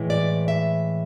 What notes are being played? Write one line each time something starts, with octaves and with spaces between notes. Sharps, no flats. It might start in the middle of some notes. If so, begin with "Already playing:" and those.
Already playing: A2 E3 G#3
D5
E5